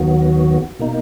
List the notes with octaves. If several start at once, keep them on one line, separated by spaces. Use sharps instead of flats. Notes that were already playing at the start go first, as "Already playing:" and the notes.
Already playing: D#2 D#3 F#3 B3 F#4
B2 A#3 D#4